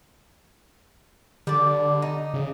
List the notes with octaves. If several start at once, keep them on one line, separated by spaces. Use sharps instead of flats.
D3 G3 D5
D#4
C#3